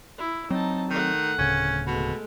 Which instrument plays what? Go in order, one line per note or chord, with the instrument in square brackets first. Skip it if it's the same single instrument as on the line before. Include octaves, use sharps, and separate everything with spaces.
[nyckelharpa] E4
[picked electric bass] F#3 C4 [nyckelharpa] D#4 A5
[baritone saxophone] D#3 [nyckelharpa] A3 F#5
[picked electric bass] D1 C#3 [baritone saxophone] C#4
[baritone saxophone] B2 [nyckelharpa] G#3 A3